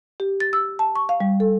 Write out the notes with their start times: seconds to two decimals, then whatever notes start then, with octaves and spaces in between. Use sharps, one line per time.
0.20 G4
0.40 A6
0.53 E6
0.79 A5
0.96 C#6
1.09 F5
1.20 G3
1.40 A4